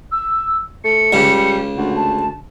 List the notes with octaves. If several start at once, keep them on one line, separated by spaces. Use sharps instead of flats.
E6
A3 C#7
C#2 C#3 G3
D2 F#5
A5